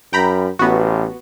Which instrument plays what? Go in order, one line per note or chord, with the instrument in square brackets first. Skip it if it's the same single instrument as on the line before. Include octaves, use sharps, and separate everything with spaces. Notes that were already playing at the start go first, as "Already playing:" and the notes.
[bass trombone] F#2 [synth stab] G5 A#5 B5
[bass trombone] A1 [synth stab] B3 F#4